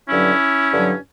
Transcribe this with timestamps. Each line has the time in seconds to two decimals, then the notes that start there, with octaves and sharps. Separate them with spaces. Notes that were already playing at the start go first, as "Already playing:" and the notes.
0.09 G2 D3 F#3 C#4 E4
0.72 G2 D3 F#3